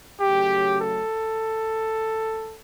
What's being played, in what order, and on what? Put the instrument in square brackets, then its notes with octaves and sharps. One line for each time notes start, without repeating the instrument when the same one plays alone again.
[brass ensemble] C#3 F#3 A3 G4
A4